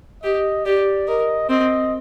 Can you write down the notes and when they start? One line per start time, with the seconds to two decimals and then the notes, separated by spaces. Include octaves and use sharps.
0.23 G4 D#5
0.65 G4 D5
1.08 A#4 D#5
1.50 C4 D#5